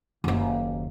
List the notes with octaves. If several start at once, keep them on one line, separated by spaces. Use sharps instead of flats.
F#1 D#2